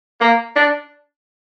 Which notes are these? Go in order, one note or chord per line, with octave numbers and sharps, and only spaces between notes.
A#3
D4